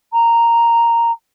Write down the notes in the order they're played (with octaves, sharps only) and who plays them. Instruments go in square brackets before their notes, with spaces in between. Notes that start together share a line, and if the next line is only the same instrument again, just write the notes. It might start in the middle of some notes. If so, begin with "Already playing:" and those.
[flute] A#5